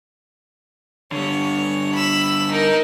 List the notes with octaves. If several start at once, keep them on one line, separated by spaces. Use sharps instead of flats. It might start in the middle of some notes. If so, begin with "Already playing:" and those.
D3 G3 C#5
B5 E6
D#4 A#4